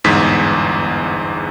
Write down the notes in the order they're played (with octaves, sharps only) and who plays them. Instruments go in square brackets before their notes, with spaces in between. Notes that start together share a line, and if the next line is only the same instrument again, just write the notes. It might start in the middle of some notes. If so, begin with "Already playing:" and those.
[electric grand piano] G1 E2 G#2 B6